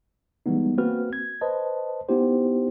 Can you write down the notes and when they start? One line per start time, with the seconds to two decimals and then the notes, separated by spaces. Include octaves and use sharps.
0.46 E3 G3 G#3 B3 D#4
0.78 A#3 C4 F#4 B4 F6
1.13 G#6
1.41 B4 C5 D#5 A5
2.08 B3 D#4 E4 G4 C5